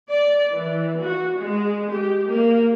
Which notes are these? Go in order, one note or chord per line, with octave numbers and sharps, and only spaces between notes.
D5
E3
F#4
G#3
G4
A#3